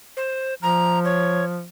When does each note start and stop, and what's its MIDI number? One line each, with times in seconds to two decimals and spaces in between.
0.17 0.54 72
0.63 1.68 53
0.63 0.99 82
1.05 1.45 73